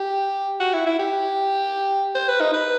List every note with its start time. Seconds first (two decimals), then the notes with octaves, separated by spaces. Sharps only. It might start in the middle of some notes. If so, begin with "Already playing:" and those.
Already playing: G4
0.60 F#4
0.73 E4
0.86 E4
0.99 G4
2.15 C5
2.28 B4
2.41 D#4
2.54 B4